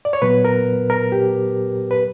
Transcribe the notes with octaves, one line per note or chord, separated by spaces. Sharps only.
D5
C#5
A#2 F#3 B3 B4
A#4
A#4
G4
B4